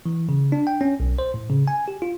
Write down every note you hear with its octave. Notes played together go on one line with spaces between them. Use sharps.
E3
C#3
D4
G5
C#4
B1
C5
A2
C#3
G#5
G4
F4